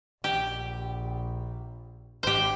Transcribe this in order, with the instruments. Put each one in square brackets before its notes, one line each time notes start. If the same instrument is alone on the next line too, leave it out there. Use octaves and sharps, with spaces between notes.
[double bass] A#1 [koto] G4
[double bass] G#1 [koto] G4 C5